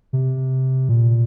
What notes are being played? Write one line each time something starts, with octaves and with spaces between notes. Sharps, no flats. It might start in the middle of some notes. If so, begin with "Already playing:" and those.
C3
A#2